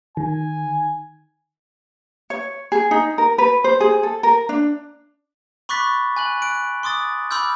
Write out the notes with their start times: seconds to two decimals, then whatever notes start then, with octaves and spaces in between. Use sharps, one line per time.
0.17 D#3 G#5
2.30 C#5
2.72 G#4
2.91 D#4
3.18 A#4
3.38 B4
3.64 C5
3.81 G#4
4.03 A4
4.23 A#4
4.49 D4
5.69 B5 C#6 D6 F#6 A6 B6
6.17 G#5 F#6 F#7
6.42 F#6 D7
6.83 C6 D6 D#6 A6
7.31 B5 C6 D6 E6 F6 G6